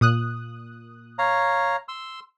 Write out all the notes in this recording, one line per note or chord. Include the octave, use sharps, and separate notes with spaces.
A#2 D#6 F#6
C#5 F5 A#5
C6 E6